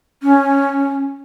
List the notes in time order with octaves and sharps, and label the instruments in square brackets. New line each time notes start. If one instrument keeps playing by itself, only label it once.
[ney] C#4